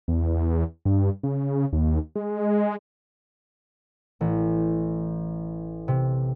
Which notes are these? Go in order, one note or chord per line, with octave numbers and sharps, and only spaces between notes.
E2
G2
C#3
D#2
G#3
A1
C3